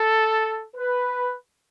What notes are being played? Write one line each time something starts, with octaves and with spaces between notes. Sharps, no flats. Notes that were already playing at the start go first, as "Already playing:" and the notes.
Already playing: A4
B4